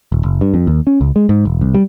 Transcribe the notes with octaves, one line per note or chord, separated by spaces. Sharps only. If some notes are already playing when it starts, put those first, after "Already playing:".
D#1
F#1
G2
F2
D#2
C#4
C#2
G#3
G#2
E1
C2
G3